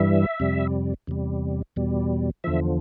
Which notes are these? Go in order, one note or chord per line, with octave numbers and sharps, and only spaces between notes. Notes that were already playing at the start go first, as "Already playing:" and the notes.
Already playing: G2 E3 G3 E5
F2 C3 G3
E2 C3 G3
E2 B2 G3
E2 D3 F3 E5